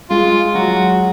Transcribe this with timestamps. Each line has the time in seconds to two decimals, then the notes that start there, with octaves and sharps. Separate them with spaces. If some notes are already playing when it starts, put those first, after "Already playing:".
0.10 G#3 F4
0.54 F#3 F#4